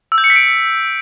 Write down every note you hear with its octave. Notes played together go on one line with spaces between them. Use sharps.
E6
G6
C#7
B6
D7